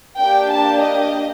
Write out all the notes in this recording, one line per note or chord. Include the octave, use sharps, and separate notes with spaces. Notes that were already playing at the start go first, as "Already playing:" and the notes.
A#3 D4 G4 G5
A5
D#5